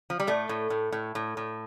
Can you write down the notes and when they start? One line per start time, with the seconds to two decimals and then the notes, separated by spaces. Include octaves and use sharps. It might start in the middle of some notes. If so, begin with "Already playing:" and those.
0.10 F3
0.20 G3
0.27 A2 A3
0.49 A2
0.70 A2
0.92 A2
1.15 A2
1.37 A2